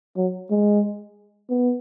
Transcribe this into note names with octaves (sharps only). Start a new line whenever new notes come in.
F#3
G#3
B3